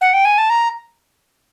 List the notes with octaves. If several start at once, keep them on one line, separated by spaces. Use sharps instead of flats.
F#5
G5
G#5
A5
A#5